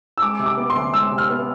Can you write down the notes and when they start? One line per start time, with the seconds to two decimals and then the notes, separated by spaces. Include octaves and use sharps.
0.18 E6
0.22 G#3 D6
0.39 C3
0.46 D6
0.57 B3
0.70 C6
0.75 D2
0.94 G#3 E6
1.12 C3
1.18 F6
1.30 B3